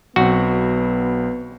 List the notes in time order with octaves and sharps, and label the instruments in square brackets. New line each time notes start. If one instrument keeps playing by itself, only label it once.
[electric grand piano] B1 C4 [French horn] B3 [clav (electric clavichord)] F#4